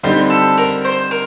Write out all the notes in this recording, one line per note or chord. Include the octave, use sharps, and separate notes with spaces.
D3 G3 C4 D#4 G4
A4
A#4
C5
A#4